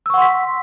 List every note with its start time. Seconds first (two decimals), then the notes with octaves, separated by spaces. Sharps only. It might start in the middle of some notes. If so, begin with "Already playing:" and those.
0.06 E6
0.10 C#6
0.14 F#5
0.18 C6
0.22 B6